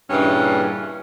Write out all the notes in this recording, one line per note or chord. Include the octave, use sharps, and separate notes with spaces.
G2 A#2 C#3 E3 C#4